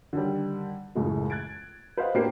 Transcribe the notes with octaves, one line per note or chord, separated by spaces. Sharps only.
D3 D#3 G3
C#2 F#2 A2 E3 G#3 A3
F#6 G#6 A6 D7
B4 C5 D#5 F5 F#5
A2 A#3 D4 G4 B4 C7